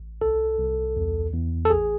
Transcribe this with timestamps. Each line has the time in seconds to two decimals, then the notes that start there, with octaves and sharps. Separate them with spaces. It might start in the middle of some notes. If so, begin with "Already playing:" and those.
Already playing: A1
0.21 C2 A4
0.59 C2
0.97 E2
1.33 E2
1.65 A4
1.70 A1 G#4